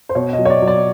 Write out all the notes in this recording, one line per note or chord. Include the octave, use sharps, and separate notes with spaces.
C5
B2 C#5
D#5
F#3
C#5
D5
F#3
D5